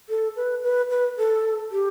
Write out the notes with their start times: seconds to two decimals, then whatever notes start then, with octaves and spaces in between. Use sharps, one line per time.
0.09 A4
0.36 B4
0.63 B4
0.90 B4
1.17 A4
1.71 G4